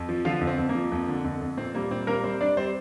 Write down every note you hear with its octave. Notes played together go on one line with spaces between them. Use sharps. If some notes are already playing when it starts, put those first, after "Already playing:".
Already playing: F2
F3
D3 F3 F4
F2
C4
F2
A#3
F3
F2
D3
F2
F2
A#2 C4
G3 A#3
A#2 C4
G3 A#3 A#4
G3 C4 C5
G3 D4 D5
G3 C4 C5